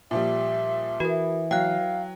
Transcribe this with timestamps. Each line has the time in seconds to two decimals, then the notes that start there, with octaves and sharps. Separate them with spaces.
0.11 A#2 F3 G3 E5
1.00 E3 F#4 A#4
1.51 F#3 F5 G5 F#6